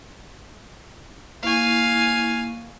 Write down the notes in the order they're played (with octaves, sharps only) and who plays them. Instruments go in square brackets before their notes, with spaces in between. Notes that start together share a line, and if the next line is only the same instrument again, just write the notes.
[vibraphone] A#3 E4 C#6 [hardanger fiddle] F5 G#5